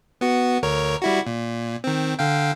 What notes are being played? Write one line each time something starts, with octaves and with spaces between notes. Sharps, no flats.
B3 F#4
D2 A#4 C#5
G3 E4 F#4
A#2
D#3 C4
D3 F5 G5